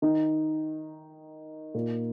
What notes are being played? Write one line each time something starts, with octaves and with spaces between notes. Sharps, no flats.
D#3 D#4
A#2 A#3